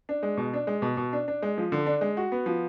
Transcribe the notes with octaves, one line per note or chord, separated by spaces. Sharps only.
D4
G#3
B2
D4
G#3
B2
B2
D4
D4
G#3
F3
D3
D4
G#3
F#4
B3
F3